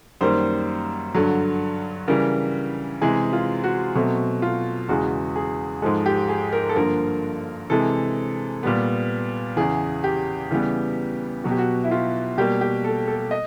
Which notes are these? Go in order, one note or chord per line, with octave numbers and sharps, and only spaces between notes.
F#2 D#3 G3 A#3 C5
G2 D3 F#3
C#3 E3 G3 A#4
C3 E3 G#3 G#4
F4
F#4
B2 F#3 A3 C4
F4
E2 C#3 E3 G#3 F#4
G#4
G#2 F3 G#3 A4
G4
G#4
A#4
A4
G2 D3 F3 A#3 A#4
C3 E3 G#3 A4
A#2 G3 B3
E2 C#3 E3 G#4
G4
C#3 E3 G3 B3
B2 F#3 B3 F#4
G4
F#4
E4
F4
B2 G3 A#3 G4
G4
A4
A4
D#5